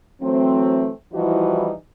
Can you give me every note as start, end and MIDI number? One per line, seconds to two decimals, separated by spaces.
0.22 0.89 52
0.22 0.89 54
0.22 0.89 57
0.22 0.89 60
1.14 1.70 52
1.14 1.70 53
1.14 1.70 55
1.14 1.70 63
1.14 1.70 64
1.14 1.70 66